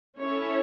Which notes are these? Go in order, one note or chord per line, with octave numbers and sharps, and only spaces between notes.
C#4 E4 A4 C#5